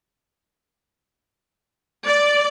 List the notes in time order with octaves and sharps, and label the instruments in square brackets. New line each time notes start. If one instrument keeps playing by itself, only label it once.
[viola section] D5